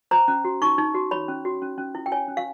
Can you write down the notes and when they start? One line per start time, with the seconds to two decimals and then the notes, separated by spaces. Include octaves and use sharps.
0.11 C5 A#5
0.28 C#4
0.45 F#4
0.62 D#4 C#6
0.78 D#4
0.94 F#4
1.11 C#5 B5
1.28 C#4
1.45 F#4
1.62 C#4
1.78 C#4
1.95 E4
2.06 G5
2.12 C#5 G#5
2.28 C#4
2.37 F5